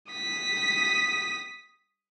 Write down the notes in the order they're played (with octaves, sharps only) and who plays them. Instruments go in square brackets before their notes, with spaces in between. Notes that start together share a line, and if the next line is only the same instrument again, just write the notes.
[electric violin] D#6 B6